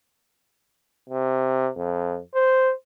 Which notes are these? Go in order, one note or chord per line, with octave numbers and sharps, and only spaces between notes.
C3
F2
C5